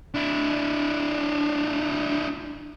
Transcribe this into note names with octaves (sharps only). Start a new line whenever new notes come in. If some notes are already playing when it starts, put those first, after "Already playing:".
D4 E4